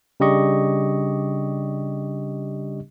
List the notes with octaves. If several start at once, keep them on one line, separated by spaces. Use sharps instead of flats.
C#3 G3 D4 G4 D#5 C#6